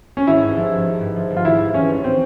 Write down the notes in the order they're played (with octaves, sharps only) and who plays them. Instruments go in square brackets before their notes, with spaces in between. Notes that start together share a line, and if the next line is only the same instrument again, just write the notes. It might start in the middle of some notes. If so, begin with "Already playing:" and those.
[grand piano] C#4
[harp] G#1 [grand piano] E4
[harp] G2
F3
G#1
G#1
G2
F3
G#1
[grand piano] F4
[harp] G#1 [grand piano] E4
[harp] G2
[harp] E3 [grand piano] C#4
[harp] G#1
[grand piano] C4